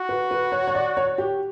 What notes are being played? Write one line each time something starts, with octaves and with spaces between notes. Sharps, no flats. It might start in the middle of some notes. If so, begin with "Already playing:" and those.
Already playing: F#4
B4
B4
C#5
C#5
D5
C#5
G4